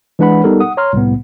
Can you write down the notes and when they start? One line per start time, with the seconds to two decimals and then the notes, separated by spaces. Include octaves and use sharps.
0.19 E3 G#3 D4 B4 F#5 B5
0.44 G3 B3 D#4 G4 A4 A#4
0.60 F#5 D#6
0.77 C#5 A#5 C6 F6
0.93 C2 A2 B3